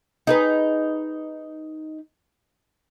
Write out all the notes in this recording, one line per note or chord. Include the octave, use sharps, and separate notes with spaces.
D#4 G#4 B4